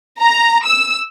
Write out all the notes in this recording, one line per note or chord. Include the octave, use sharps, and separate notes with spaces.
A#5
E6